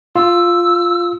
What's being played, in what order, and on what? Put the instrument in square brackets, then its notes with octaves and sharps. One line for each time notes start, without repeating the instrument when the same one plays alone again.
[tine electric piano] F4 [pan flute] E6